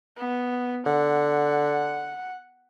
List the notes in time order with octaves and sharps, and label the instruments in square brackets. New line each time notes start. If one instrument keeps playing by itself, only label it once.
[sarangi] B3
[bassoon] D3 [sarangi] F#5